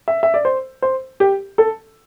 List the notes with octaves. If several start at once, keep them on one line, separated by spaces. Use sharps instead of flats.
E5
E5
D5
C5
C5
G4
A4